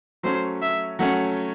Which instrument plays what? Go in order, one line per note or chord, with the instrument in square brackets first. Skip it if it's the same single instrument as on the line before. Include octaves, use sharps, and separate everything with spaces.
[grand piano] F#3 A3 C#4 [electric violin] C5
[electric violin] E5
[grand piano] F#3 A3 C#4 [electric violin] F#5